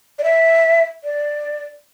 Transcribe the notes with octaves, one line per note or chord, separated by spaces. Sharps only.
D5
E5
D5